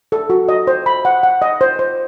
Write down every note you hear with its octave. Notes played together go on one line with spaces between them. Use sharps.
A4
F#4
D#5
C5
B5
F#5
F#5
D#5
C5
C5